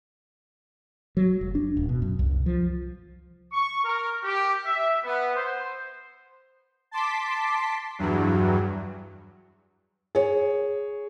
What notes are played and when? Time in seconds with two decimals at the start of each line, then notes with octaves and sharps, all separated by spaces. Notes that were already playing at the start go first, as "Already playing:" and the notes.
1.17 F#3
1.41 F1
1.55 D4
1.77 D1
1.89 B2
2.02 F#2
2.19 C2
2.46 F3
3.52 C#6
3.84 A#4
4.24 G4
4.65 E5
5.03 B3
5.34 C5
6.91 A5 C6 D6 B6
7.99 E2 G2 F#3
10.15 G#4 C#5